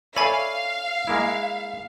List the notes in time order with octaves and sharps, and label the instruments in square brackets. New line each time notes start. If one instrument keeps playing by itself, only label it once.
[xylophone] A4 G#5 B5 [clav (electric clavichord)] C#5 D5 E5 [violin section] F5
[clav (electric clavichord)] G#3 A#3 E4